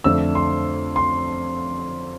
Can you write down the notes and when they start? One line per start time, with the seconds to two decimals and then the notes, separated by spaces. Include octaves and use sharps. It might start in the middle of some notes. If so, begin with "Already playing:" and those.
0.04 F2 D3 A3 D4 E6
0.35 C6
0.96 C6